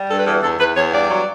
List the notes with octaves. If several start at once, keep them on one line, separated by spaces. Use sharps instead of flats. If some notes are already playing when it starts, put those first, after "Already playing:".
Already playing: G3
G2 A4
B4
E2 A4
E2 A4
E2 B4
E2 C#5
G2 D5
F#3